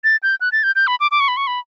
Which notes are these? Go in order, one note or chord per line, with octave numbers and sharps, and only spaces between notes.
A6
G6
F#6
A6
G6
G6
B5
D6
D6
C#6
B5
C#6
B5